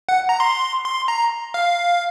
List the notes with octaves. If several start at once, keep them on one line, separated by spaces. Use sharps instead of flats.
F#5
A#5
C6
C6
A#5
F5